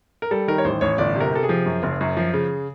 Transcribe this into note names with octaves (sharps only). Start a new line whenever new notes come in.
A#4
G3 A4
D#3 A#4
C#5
A1 C5
A1 C#5
G1 D5
C3 A#4
C3 A4
G#4
F3
F#2
F#1
F#2
F3
C#3